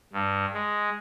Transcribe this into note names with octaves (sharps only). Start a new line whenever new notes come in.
G2
G#3